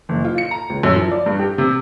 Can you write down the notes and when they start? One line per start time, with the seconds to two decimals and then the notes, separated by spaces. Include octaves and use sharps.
0.09 F#1
0.25 F4
0.38 C#7
0.51 A#5
0.70 C#2
0.83 F#2
0.96 F3
1.11 D5
1.26 G2
1.39 G4
1.58 C3